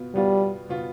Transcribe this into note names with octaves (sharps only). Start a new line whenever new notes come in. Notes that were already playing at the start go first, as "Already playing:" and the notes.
Already playing: B2 B3 F4
B2 G3 B3 F4
B2 B3 F4